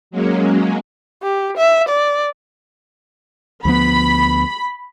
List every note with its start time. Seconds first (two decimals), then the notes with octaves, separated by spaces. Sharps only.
0.11 F#3 G#3 A#3 C#4
1.23 G4
1.57 E5
1.88 D5
3.65 D2 F3 B3 B5